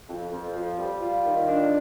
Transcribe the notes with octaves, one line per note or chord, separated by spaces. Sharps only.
F2
F2
F3
G3
F4
D#3
D4